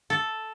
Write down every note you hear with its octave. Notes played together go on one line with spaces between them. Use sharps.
A4